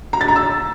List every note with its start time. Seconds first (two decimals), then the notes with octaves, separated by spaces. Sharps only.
0.13 A#5
0.21 A6
0.28 A#5
0.36 E6